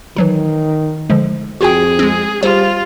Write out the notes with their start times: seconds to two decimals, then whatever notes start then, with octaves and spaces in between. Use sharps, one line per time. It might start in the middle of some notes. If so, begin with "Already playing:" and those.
0.16 D#3 E3 F#3 D#4
1.10 D3 F3 G#3
1.61 F2 F4 F#4 G#4 G5
1.99 G#3 C4
2.43 G3 F4 C5